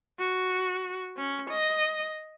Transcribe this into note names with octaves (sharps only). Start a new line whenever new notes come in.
F#4
C#4
D#5